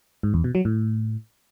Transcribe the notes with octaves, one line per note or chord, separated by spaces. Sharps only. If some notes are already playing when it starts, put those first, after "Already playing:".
G#2
E2
B2
F#3
A2